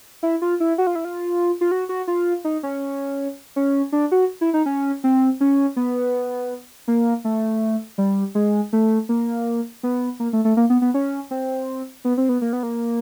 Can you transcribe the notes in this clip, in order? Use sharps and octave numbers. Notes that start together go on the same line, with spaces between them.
E4
F4
E4
F#4
F4
E4
F4
F4
F#4
F#4
F4
D#4
C#4
C#4
D4
F#4
E4
D#4
C#4
C4
C#4
B3
A#3
A3
G3
G#3
A3
A#3
B3
A#3
A3
A3
A#3
B3
B3
C#4
C4
B3
C4
B3
A#3
B3
A#3